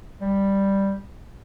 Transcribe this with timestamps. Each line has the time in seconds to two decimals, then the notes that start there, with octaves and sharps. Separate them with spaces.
0.21 G3